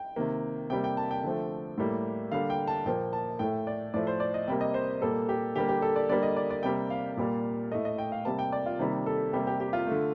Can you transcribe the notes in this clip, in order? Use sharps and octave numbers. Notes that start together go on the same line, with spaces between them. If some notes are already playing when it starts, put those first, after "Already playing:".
Already playing: G5
C3 D#3 A#3
C3 G3 A#3 G5
G5
A5
G5
D3 F3 A3
A2 G3 A#3
D3 G3 A#3 F5
G5
A5
A#2 F3 A#3 G5
A5
A2 A3 G5
D5
A2 F3 A3 D5
C5
D5
D#5
C3 G3 A#3 G5
D#5
C5
A#2 G3 A#3 A4
G4
D3 G3 A#3 G4
G4
A4
D5
D3 G3 A#3 D5
D#5
D5
D5
C3 G3 A#3 G5
F5
A#2 G3 A#3
A2 A3 D#5
D#5
G5
F5
C3 G3 A#3 A5
G5
D5
F4
C3 D#3 G3 A#3
A4
C3 G3 A#3 G4
G4
G4
F4
D3 A3